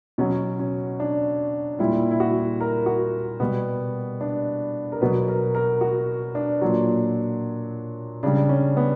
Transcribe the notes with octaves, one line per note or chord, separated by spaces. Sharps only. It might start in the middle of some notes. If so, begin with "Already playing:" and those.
B2 F#3 C#4
C#4
D4
A#2 G3 E4
E4
F#4
A#4
F#4
B2 G3 B3
D4
A#4
B2 F#3 B4
A#4
A#4
F#4
D4
A#2 F#3
C#3 G3 D4
C#4
B3